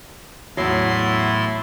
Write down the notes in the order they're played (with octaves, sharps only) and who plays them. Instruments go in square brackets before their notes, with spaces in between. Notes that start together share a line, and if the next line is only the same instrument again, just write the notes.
[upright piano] E2 F#3 [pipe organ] A2 E4 C6